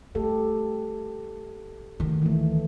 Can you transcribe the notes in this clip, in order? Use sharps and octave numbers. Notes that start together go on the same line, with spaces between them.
A3 G4 A4
D2 D#3
E3 A3